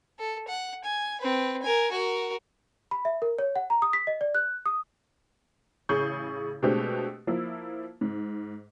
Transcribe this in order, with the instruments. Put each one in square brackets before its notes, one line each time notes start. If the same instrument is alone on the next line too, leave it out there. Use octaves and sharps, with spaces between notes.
[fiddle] A4
F#5
G#5
C4 B4
A#4 G#5
F#4 A#4
[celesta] B5
E5
A#4
C#5
F#5
A#5
D#6
B6
D#5
D5
F#6
D#6
[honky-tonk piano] A1 C#3 G#4 C#6 G6
B2 G#3 A3 C4 D4 G4
F3 A#3 E4
G#2